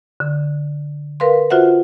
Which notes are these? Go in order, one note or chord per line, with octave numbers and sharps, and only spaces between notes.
D3
A#4 B4 F5 C6
F4 F#4 C5 E5 F#5